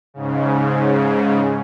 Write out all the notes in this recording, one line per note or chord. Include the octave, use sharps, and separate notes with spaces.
G#2 C#3